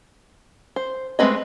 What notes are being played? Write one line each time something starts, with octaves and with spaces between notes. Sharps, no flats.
C5
G#3 A3 C4 B4 D#5